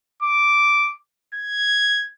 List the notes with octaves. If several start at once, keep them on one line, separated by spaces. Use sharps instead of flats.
D6
G#6